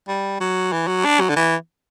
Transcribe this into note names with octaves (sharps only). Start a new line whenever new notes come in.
G3
F#3
E3
F#3
D4
F#3
D3
E3